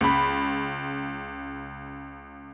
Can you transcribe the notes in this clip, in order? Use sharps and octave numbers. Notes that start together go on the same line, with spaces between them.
C#2 B5